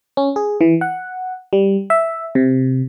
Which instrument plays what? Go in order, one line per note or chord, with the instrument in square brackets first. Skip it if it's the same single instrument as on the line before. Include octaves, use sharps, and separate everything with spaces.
[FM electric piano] C#4
G#4
E3
F#5
G3
E5
C3